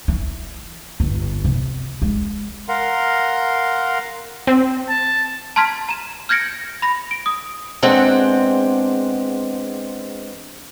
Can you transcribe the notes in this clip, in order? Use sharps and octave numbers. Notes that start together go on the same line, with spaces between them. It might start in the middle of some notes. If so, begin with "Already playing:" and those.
E3
G1
C3
G#3
A#4 F5 F#5 A#5 C6
C4
A5
A5 A#5 C6 F6 G#6 B6
A#5 E7
F6 G6 G#6 A#6 C#7 D7
B5 A#6
D7
D#6
E2 G#3 C4 D4 A4 F#5